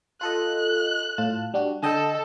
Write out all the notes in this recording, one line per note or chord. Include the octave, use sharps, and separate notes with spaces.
F4 A4 D#5 F#6
A2 F4 A5
G3 D4 F#4
D3 A4 D#5 G5